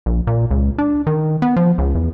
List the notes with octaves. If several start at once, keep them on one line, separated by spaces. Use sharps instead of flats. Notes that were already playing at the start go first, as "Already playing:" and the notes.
A#1
A#2
C#2
D4
D#3
B3
F3
C#2
E2